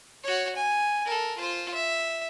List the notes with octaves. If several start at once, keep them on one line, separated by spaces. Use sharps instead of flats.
F#4 C#5
G#5
A4 A#4
F4 C5
E5